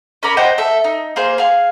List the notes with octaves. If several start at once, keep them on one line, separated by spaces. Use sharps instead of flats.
C#4 A#4 D5 B5
C5 D#5 F#5 G5
A4 E5
D#4
A#3 G#4 C5
G#4 F5